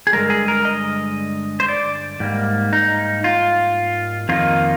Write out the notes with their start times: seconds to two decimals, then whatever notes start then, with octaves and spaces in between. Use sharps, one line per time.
0.07 G#4
0.13 G2 D3 G#3 A#4
0.30 G#4
0.48 A#4
0.65 D#5
1.60 C5
1.68 D5
2.20 G#2 G3 A#3
2.73 D#4
3.24 F4
4.29 F2 D#3 A#3 D#4 F4